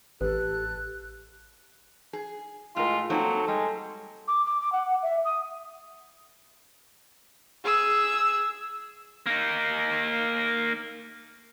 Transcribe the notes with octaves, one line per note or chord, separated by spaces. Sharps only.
A1 G4 A4 B4 F#6
G#4
A2 G#3 F4 A#4
F#3 A#3 C4 D#4 A4
G3 G#3
D6
D6
D6
F#5
E5
D#6
G#4 E6
A#3 D#4